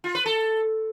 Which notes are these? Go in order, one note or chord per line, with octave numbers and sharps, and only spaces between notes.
F4
B4
A4